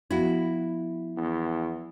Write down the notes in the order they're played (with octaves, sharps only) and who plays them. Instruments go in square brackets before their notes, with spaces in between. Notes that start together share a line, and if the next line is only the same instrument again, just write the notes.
[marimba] F3 B3 [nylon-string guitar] E4 F#4
[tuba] E2